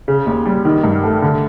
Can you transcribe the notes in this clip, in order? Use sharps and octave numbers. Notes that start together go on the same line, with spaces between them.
C#3
D#2
G3
D#3
G2
A3
D3